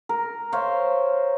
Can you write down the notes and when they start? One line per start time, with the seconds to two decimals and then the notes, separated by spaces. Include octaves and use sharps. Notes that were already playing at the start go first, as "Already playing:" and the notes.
0.09 A#4
0.52 C5 C#5 E5 F5